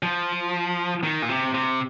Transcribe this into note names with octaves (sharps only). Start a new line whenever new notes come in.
F3
D#3
A#2
C3
C3